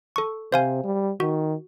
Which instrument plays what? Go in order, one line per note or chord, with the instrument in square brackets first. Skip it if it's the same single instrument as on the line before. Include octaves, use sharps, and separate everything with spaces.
[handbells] A4 C#6
[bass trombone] C3 [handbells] C5 F5 G#5
[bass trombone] G3
[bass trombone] D#3 [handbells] F#4